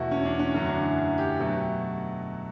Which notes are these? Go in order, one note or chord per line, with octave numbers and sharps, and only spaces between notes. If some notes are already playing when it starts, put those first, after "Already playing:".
Already playing: E2 B2 A3 E4 F#4
C#4
D4
C#4
F#2 D3 F#3 A3 C#4
D4
E4
G4
B2 F#3 A3